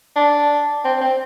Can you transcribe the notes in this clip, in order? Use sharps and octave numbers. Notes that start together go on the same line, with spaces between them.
D4
C4
C4